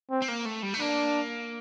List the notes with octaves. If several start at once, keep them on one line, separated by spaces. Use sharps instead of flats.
C4
C4
A#3
A3
G3
A3
A#3 D4